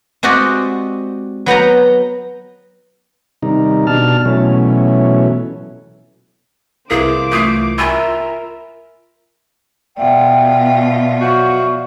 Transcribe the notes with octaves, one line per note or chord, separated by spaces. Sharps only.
G#3 C4 F#4 G4 D5 D#5
F#3 B3 G5 A#5
C3 D#3 G3 D#4
B2 D4 A5 F6
B2 E3 F#3 A3 C#4
C2 E3 A#3 G#4 C5 D6
A3 F4 D#6 C7
F4 A#4 E5 G#5 B5 E6
B2 F4 D5 E5 F#5 G5
F3 F#3 F#4 C#6